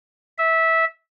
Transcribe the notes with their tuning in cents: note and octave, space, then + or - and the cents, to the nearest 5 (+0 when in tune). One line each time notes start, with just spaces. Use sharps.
E5 -15